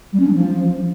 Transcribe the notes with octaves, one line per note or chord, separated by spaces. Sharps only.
G3
C#4
D4
F3